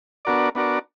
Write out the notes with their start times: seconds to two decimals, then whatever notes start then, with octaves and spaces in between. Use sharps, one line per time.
0.25 B3 D4 F#4 A#4 D5
0.55 B3 D4 F#4 A#4 D5